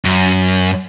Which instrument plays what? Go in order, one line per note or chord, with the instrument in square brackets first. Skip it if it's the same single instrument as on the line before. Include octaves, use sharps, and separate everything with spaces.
[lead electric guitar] F#2